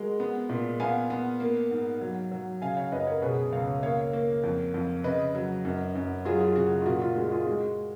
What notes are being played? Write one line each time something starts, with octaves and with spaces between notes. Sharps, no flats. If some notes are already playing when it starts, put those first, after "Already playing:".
Already playing: G#3 F#4 A#4
B3
A#2
B3 F5 G#5
B3
A#3
G#2
F#3
F#3
C#3 F5 G#5
C#5 F5
F#2 B4 D#5
A#4 C#5
B2 G#4 B4
C#2 C#5 F5
A#3 C#5 F5
A#3
F2
F2
C#3 B4 D#5
F#3
F#2
F#2
F#3 F4 G#4
F4 G#4
C#3 F#4
F#4
F4
A#2 F#4
F4
G#3 F#4
F4 G#4
G#3 F#4